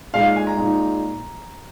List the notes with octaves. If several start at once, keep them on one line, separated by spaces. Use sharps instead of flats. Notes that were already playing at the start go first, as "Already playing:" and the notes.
A#2 G#3 D#4 F5
G#5
A#5
A#2 G#3 D#4